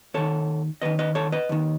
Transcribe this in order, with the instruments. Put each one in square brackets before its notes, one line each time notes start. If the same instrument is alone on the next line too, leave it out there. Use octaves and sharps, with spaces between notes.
[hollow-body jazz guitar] D#2 D#3 A4 C#5
D#2 D#3 B4 D#5
B4 D#5
A4 C#5
B4 D#5
D#2 D#3